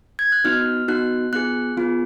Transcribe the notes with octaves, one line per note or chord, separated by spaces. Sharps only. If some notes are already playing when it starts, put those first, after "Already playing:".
G#6
F#6
B3 D#4 F#4 F6
B3 D#4 F#4 F#6
B3 F4 G#4 F#6
B3 F4 G#4